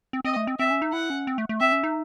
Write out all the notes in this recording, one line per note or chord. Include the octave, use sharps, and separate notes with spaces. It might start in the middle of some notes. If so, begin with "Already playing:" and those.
C4
C4 D#5
A3
C4
C4 E5
C#4
D#4
E4 F#5
C#4
C4
A3
A3
C4 E5
C#4
D#4